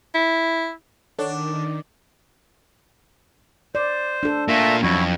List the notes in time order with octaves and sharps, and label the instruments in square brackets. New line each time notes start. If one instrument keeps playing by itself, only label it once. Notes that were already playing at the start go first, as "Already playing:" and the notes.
[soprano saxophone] E4
[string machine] D#3 [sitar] D4 [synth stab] A4 C#5 F#5
[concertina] C5 [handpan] D5
[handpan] D4 A4
[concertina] A3 E5 A5 [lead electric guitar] A#3 F4
[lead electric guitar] F2 [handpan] F#3 C#4 [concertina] E4 F#4